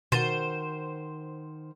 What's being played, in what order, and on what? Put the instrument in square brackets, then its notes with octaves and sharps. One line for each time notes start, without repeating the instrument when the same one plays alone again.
[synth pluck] B2 A6 D#7 [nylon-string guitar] D#3 F#4 [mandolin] C5